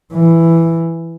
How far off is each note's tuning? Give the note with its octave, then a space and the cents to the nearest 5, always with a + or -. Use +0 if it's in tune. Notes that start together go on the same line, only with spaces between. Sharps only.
E3 +5